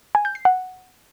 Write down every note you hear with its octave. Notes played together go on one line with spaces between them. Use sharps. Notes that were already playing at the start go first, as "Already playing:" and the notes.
G#5
G6
C7
F#5